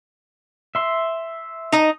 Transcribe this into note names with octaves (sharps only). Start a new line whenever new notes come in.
E5 C6
D#4 D#5